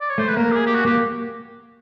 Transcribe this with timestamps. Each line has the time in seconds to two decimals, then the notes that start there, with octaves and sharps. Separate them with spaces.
0.01 D5
0.10 C#5
0.18 A3 C5
0.29 B4
0.37 A#3 A#4
0.51 G4
0.56 G#4
0.66 G4
0.75 F#4
0.85 A#3 G4